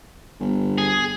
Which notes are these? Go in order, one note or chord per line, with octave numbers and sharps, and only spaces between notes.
G1
G#4